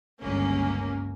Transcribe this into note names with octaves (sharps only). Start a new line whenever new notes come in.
G1 C#2 A#3 C#4